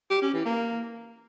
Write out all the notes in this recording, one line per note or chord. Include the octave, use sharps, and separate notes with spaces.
G4
C#4
E3
A#3